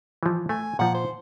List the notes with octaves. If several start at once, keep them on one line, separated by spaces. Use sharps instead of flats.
E3 F3
A3 G#5
A#2 F3 F#5
C5